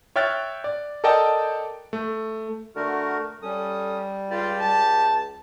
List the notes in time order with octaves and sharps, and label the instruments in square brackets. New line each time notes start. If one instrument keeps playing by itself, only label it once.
[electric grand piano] C#5 E5 G5 F6 F#6 A6
D5
A4 A#4 D5 D#5 G5 A5
A3
[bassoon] D3 [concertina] A3 F#4 A#4
[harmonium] G3 [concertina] C#4 D#6 [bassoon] A4
[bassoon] C#2 [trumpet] F4 [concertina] G4 D5
[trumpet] A5